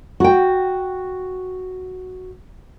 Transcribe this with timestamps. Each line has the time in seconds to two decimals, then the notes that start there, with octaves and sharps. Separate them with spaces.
0.20 F#4 G5